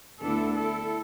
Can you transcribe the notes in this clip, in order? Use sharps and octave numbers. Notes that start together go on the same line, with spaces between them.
D2 D3 B3 D4 E4 A4
E4 A4